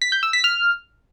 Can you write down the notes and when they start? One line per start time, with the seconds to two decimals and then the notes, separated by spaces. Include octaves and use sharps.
0.02 B6
0.12 G6
0.23 E6
0.33 B6
0.44 F6